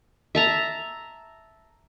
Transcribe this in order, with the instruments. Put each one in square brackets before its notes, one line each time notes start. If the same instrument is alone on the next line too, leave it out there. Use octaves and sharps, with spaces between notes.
[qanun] E5 A5 A#5